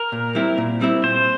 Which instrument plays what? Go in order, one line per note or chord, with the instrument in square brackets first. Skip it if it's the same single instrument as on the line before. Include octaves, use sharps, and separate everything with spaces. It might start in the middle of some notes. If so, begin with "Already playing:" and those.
Already playing: [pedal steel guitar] A#4
[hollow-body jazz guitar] A#2
G3 C4 E4
A#2
G3 C4 E4
[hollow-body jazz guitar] A#2 [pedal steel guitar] C5